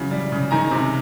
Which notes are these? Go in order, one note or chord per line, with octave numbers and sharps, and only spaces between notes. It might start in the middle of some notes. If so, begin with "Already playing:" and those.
Already playing: C#3 E3 F#3
G3
C#3
D#3 G#5 A#5
C3